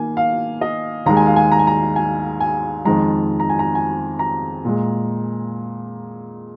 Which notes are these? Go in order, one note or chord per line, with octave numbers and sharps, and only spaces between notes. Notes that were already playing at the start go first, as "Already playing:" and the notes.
Already playing: D#3 A#3 G#5
F5
D#5
D#2 D#3 G#3 A#5
G#5
F5
G#5
A#5
G#5
A#5
G#5
G#5
F2 D#3 G#3 A#5
A#5
G#5
A#5
G#5
A#5
A#2 G#3